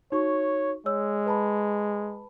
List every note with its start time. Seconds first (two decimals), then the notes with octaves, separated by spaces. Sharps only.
0.12 D#4 F#4 C#5 C#6
0.86 G#3 C#5 E6
1.26 B4 A5 B5